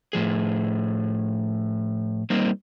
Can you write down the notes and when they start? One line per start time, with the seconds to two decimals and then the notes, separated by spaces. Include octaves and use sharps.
0.13 A2 F3 G#4
2.30 G3 A#3 C4 D#4